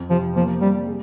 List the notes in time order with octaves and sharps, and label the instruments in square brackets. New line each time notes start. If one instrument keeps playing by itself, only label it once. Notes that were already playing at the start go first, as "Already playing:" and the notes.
Already playing: [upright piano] F2
[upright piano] C3 [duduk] F3
[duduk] F3 [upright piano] A#3
[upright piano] C3 [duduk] G3
[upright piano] G#4